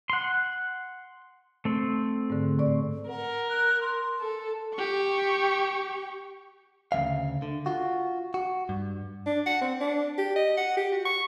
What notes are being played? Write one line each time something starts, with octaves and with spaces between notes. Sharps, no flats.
F#5 C6
A3 C4
G#2 D3
A2 D5 C#6
A#4 F#5
F#6
C6
A4
G4 C#6
D2 C#3 E3 E5 F5
D3
F4 F#4
F#4
G2
D4
F#5
C4
D4
G4
D#5
F#5
G4
F#4
C#6